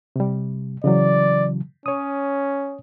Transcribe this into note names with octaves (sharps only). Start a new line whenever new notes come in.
C3 G3
C#3 E3 F#3 D5
C#4 C#5 D#6